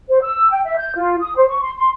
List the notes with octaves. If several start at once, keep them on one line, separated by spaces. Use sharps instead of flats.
C5
E6
G5
E5
G6
F4
D#6
C5
C#6
C6
C6